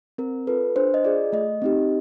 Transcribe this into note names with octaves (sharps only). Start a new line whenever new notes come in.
C4 A#4
F4 A4 B4
D4 C5
D#5
F4 G#4 D5
A3 D#5
C4 D#4 G4